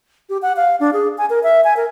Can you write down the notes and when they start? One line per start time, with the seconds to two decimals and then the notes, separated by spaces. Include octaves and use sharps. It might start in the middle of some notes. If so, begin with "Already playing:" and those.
0.30 G4
0.42 F#5
0.56 F5
0.80 D4
0.93 G#4
1.18 G#5
1.30 A#4
1.43 E5
1.64 G#5
1.77 A#4